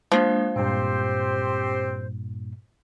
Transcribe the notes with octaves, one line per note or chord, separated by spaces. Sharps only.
F3 G#3 A#3 D4
G2 A#2 C4 G4 C5